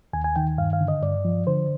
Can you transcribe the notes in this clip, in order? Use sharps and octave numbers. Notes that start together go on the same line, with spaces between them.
D#2 G#5
G#5
D#3 G5
G2 F5
F5
D3
D#5
G2 D5
F3
D3 C5